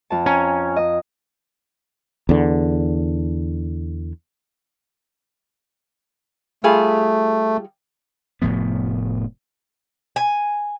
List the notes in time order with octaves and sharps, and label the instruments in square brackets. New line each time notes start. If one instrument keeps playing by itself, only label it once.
[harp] F2 A5
[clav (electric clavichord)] C#4 [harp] G#5 A#5
[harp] D#5
[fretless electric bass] E2 D3
[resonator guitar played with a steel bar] G3 F4 G#4 [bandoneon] A3
[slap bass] F1 A2 F3 B3
[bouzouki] G#5